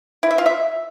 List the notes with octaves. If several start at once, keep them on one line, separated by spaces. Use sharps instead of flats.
E4
E5
F4
E5